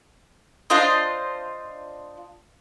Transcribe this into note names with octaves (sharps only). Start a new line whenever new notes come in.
D4 F4 C5 D#5